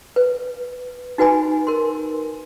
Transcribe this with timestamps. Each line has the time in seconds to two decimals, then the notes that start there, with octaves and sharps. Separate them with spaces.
0.16 B4
1.18 D#4 F#4 B4 G#5 B5
1.67 A#4 C6